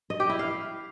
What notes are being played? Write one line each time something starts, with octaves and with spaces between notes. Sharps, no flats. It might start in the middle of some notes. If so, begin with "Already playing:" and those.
D#5
G4
E4
F5